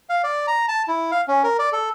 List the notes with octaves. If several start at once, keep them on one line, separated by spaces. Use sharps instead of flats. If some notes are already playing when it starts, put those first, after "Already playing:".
F5
D5
A#5
A5
E4
F5
C#4
A#4
D5
A4